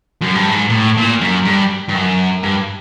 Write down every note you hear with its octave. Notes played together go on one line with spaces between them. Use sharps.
F#2
G2
G#2
A#2
A2
A#2
F#2
G2
G2
F#2
G2